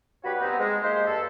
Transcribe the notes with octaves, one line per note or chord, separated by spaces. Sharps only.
G2 F#4 G4 B4 C#5 B5
B3 C4 D#4
G#3
G#3 A#3 D#4 G4 C5
G2 A4